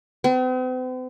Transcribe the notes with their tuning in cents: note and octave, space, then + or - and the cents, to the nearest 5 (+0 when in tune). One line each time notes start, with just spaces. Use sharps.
C4 -45